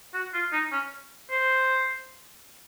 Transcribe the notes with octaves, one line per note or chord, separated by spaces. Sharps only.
F#4
F4
D#4
C#4
C5